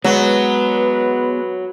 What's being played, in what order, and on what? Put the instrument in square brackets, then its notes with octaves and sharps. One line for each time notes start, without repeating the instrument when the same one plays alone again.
[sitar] F#3 [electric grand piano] G#3 [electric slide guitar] B3 [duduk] B4